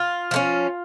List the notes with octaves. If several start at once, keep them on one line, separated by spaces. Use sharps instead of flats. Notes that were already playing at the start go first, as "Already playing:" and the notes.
Already playing: F4
F3 A3 C#4